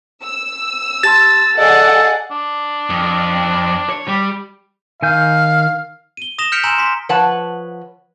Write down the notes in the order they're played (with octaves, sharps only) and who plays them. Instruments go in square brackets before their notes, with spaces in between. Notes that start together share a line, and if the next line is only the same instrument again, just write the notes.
[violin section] E6
[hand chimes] G4 A5 C6 [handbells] A6
[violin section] G#4 D5 F#5 [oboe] A4 [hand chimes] D#5 F5
[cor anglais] D4
[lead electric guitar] F2
C#5
[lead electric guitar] G3 [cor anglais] G4
[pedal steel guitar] D#3 G#5 G6 [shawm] F5
[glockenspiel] D#7 G7
D#6 A#6 E7 F7 G7
F6 G6 B6 C#7 D7 F7
G#5 A#5 C6 E6 E7
C6 B6
[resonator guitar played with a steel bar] F3 B4 C#5 F#5 A5